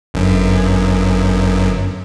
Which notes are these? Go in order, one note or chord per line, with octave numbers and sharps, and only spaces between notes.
G1 F#2